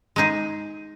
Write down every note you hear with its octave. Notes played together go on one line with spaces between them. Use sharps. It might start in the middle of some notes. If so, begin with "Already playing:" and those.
G#3 D#4 G#4